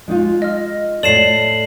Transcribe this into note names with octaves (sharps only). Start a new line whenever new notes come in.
G#3 D#4 F4
D#5 F6
A2 A4 C#5 D5 C7 E7 F#7